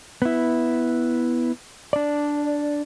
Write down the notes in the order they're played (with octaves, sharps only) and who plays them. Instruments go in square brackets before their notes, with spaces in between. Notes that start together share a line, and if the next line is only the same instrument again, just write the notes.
[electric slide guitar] B3 E4
D4 D5